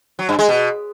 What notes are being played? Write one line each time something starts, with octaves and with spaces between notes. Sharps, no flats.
F#3
G2
G#3
B2